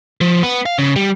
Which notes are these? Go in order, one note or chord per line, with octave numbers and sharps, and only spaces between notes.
F3
B3
F5
C#3
G3